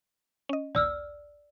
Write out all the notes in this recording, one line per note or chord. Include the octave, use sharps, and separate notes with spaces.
C#4 D#5
A#1 D#2 D5 E6 F6